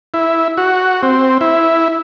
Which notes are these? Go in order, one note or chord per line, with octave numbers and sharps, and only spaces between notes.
E4
F#4
C4
E4